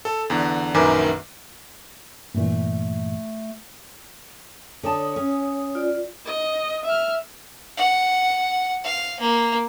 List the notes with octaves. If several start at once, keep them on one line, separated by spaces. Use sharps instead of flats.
A4
E2 D3
A#1 F#2 D#3 B4 G#5 D6
G2 A#2 E3 A3
D3 C#5 A5 D#6
C#4
F4 D5
D#5
E5 F6
F#5
F5
A#3